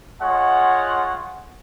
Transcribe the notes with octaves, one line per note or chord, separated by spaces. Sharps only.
G#3 F4 C#5 F#5